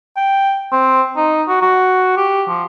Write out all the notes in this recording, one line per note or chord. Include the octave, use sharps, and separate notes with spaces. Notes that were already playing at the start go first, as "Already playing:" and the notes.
G5
C4
D#4
F#4
F#4
G4
F3